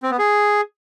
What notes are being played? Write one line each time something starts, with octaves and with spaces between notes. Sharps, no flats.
C4
B3
G#4